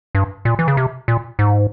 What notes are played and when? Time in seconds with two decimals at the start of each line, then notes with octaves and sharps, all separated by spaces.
0.15 G2
0.45 A#2
0.59 E3
0.68 C#3
0.77 C3
1.08 A#2
1.39 G#2